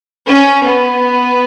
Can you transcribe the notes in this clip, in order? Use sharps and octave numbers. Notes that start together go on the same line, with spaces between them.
C#4
B3